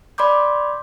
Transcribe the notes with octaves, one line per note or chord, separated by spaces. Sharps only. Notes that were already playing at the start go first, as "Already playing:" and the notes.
D5 B5 C6 D6 G6